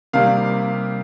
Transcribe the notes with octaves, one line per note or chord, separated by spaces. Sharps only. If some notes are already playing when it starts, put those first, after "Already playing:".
C3 D#3 G3 A#3 F5